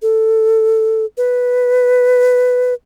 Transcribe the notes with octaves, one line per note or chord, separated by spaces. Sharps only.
A4
B4